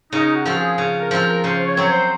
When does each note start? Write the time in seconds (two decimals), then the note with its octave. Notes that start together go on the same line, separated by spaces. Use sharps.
0.12 C#3 D#4
0.34 F#4
0.45 F3 C4 F4
0.56 G#4
0.78 C#3
1.00 A#4
1.11 F3 C4 F4
1.22 A#4
1.44 C#3 C5
1.66 C#5
1.77 F#3 C4
1.88 C5